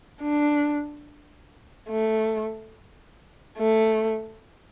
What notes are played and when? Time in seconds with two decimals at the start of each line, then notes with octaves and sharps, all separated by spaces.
0.22 D4
1.89 A3
3.57 A3